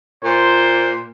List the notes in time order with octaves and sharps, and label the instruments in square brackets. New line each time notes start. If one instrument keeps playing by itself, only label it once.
[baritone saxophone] A#2 [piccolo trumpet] C5